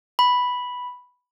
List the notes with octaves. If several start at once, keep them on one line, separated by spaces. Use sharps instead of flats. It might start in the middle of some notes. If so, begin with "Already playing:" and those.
B5